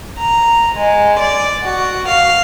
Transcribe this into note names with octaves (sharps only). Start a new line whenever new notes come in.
A#5
G#3
D5
F#4
F5